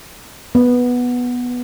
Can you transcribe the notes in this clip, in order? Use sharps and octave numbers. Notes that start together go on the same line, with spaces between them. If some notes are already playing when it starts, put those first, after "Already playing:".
B3